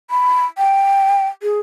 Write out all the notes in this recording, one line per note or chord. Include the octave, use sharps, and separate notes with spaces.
B5
G5
G#4